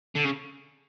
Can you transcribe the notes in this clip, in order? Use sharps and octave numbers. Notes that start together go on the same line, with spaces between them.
D3
C#3